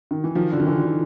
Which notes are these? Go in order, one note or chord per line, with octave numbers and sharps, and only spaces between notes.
D#3
E3
D#3 F3
D3
D#3
D3 E3